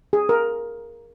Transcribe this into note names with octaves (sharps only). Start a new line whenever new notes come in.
G#4
A#4